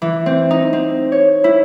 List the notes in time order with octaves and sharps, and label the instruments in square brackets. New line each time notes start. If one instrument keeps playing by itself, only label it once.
[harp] E3
C4
D#4
C4
C#5
E4